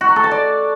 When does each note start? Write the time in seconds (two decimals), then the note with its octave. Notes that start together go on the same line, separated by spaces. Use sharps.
0.01 F#4
0.08 A#5
0.16 A4
0.24 A5
0.31 D5